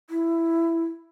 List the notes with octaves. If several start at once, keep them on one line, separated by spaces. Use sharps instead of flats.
E4